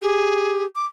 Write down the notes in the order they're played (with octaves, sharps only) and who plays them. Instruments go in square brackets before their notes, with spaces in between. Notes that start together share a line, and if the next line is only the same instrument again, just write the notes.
[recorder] G4 [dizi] G#4
[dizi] D6